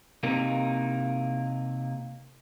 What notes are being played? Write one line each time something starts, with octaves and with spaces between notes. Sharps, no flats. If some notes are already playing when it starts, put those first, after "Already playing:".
C3 A#3 D#4